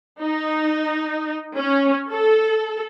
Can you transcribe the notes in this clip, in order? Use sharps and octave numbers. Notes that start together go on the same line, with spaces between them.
D#4
C#4
A4